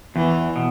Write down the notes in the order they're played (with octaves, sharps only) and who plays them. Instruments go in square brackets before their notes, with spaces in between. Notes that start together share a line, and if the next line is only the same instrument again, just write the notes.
[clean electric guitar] E2 [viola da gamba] E3
[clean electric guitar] B2